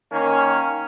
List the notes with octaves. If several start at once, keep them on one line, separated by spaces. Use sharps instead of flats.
D#3 A#3 C#4